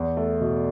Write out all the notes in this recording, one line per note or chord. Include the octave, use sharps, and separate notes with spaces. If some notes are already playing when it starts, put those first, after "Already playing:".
Already playing: E2
A3
B2